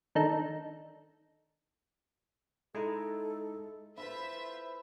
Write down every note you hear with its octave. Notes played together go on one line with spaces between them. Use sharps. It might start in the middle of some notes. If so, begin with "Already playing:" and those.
D#3 D4 D#4 A4
G#3 D#4 E4 A4
E4 F4 A4 B4 C5 E5